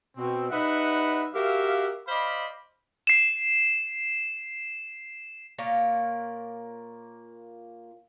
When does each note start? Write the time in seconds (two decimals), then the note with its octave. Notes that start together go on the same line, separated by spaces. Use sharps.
0.16 B2 C4
0.51 G3 D#4 B4 E5 F#5 B5
1.35 F#4 G4 A#4 E5 F5
2.08 C5 D5 D#5 F5 B5
3.07 C7 E7
5.58 A#2 A#3 C#5